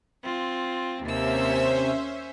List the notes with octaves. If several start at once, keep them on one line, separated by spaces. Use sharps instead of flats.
C4 F4
D#2 C3 A#3 C#4 C5 E5 E6